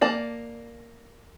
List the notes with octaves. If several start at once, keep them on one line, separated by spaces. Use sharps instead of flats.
A#3 D5 A5